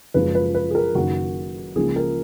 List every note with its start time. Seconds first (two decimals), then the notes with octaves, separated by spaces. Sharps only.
0.14 F#1 F#2 F3 G#3 B4
0.35 B4
0.55 B4
0.71 G#4
0.75 A#4
0.95 F#1 F#2 D#3 F#4
1.75 C#2 C#3 F3 A#3 C#4 G#4
1.96 A#4